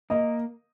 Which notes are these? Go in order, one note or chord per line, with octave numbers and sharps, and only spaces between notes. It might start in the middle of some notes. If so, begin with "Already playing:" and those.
A#3 D#5